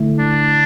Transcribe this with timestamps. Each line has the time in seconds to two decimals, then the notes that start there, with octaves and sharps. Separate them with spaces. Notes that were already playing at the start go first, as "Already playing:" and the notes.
Already playing: D3 A3 E4
0.19 D4